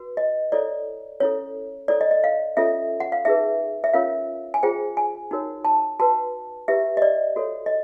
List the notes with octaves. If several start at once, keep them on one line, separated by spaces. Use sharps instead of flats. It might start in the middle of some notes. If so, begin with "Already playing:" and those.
Already playing: F#4 B4
D#5
E4 A4 C#5 D5
C#4 E4 A4 C#5
E4 A4 C#5 D5
D#5
D#5
F5
C#4 F4 A4 C#5 E5
F#5
F5
D#4 G#4 B4 E5
E5
C#4 F4 A#4 C#5 F5
G#5
F4 G#4 C5 G5
G#5
D#4 F#4 A#4 C#5
A5
F#4 B4 A5
E4 G4 B4 E5
D#5
D5
F#4 A4 C#5
D#5